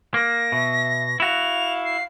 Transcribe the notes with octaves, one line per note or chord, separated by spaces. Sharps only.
A#3 A#6
B2 E5
E4 F#4 F5 F7
C7